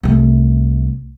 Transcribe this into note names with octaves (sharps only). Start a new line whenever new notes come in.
C2 A3